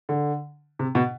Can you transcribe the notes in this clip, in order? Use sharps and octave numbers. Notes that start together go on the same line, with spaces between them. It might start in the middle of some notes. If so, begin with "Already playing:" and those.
D3
C3
B2